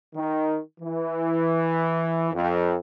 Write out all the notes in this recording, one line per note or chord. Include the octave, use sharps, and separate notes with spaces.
D#3
E3
F2